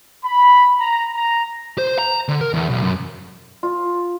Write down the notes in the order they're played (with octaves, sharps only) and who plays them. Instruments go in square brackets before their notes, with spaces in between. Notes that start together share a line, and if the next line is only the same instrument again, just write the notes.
[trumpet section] B5
A#5
A#5
[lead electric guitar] C5
A#5
D3
A#4
E2
B1
F#2
[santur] F4